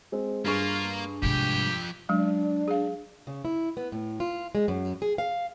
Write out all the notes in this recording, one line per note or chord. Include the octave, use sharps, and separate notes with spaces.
G#3 C4
G2 A#3 F4 G#4 C#6
G#2 C3 F3 G4 G5
F#3 G#3 D4
G#4 F5
C#3
E4
B3
A2
F4
G#3
F#2
G#4
F5